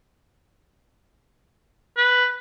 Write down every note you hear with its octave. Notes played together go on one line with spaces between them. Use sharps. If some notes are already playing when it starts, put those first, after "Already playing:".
B4